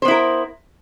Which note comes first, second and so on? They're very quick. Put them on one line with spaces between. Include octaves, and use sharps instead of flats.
C5 B3 E4 A#4